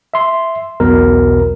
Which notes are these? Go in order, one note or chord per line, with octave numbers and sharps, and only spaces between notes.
E5 C6
B1 E2 B2 A#4